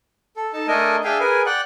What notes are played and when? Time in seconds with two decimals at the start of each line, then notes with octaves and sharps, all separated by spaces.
0.36 A4
0.53 D#4 A4 A5
0.68 A3 D4 A4 A#4 D#5 G#5
1.04 D4 G#4 E5 F5 G5 G#5
1.20 G#4 A#4 B4 G#5
1.46 D5 F#5 G5 F#6